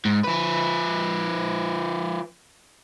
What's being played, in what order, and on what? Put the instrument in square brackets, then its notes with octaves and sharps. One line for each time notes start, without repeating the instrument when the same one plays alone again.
[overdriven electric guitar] G#2
F3 B4